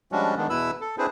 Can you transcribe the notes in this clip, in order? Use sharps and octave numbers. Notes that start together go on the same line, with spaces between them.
F3 G3 G#3 C#4 D4 F#4
D#3 G#3 B3 D4
E2 B2 E4 B4 B5 E6
A4
C4 D4 E4 G#4 B4 C5